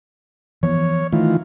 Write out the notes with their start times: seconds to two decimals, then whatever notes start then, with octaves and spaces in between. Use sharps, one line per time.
0.63 E3 F3 B3 C#5
1.13 D#3 E3 A3 F4